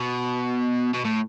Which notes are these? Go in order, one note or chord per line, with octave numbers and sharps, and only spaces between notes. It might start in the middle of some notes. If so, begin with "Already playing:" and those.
Already playing: B2
B2
A2